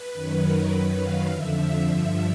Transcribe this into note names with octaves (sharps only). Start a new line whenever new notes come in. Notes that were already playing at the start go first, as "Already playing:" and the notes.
Already playing: B4
F#2 D#3 F#3
A#4
F#2 D#3 F#3 B4
F5
F2 D3 F3 E5
G2 D3 F3 E5